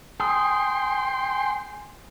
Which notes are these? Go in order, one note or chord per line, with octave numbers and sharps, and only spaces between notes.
G#4 G5 C6